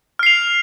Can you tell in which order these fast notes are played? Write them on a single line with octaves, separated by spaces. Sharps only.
F6 C7 F7